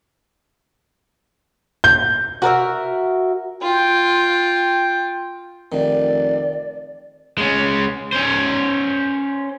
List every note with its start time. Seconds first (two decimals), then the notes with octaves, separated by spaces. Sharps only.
1.84 G6
2.42 F#4 A#4 D5 E5
3.62 F4 G5
5.72 F1 D#3 D5
7.38 G#3 C#4
8.13 C#4 C5